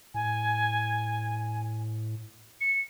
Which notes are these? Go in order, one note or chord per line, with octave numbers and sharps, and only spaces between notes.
A2 G#5
C#7